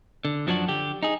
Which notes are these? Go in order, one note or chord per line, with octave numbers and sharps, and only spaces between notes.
D3
F#2 F3 F#3 D4 F#4
D3 G4
D#4 G#4